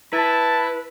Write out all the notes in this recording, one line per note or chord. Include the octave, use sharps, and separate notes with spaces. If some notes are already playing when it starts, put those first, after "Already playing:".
E4 B4 A5